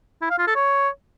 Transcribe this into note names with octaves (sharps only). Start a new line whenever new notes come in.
E4
F5
F4
A4
C#5